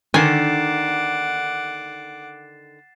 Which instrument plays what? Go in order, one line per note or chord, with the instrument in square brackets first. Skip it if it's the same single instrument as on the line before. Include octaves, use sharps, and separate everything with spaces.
[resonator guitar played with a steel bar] D3 D#3 [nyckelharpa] F#5 D6 [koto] G#5 [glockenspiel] A6 C7 E7